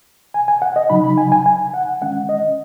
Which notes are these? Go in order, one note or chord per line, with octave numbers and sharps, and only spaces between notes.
G#5
G#5
F#5
D#5
C#3 F#3 D#4 B5
B5
G#5
G#5
G#5
F#5
D#3 G#3 C#4 F#5
D#5